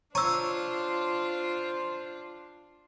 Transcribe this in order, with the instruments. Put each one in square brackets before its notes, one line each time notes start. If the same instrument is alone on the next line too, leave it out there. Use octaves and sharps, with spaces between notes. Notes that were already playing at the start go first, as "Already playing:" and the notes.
[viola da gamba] D4 F4 [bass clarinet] C5 [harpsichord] C#5 [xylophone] A#5 E6